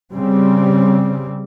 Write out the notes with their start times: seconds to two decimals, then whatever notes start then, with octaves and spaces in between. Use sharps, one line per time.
0.12 C#3 G3 C4